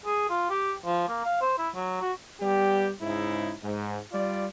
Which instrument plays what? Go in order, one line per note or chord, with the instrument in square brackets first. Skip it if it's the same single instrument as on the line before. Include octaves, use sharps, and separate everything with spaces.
[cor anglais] G#4
F4
G4
F3
A#3
F5
C5
E4
F#3
F#4
[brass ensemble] G3 B3 G4
G#2 C#3 D#4 E4
G#2
G3 F4 D5